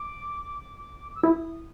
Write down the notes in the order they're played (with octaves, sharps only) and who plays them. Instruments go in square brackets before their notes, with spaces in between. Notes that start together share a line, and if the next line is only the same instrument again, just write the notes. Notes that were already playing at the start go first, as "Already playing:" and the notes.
Already playing: [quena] D6
E6
[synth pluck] E4 [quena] D#6